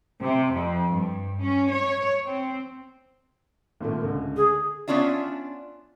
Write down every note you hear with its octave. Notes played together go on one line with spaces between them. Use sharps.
C3
F2
G2
C#4
C#5
C4
G#1 A#2 A3
C#2 D3
G#4
B3 C#4 D4 F4 E5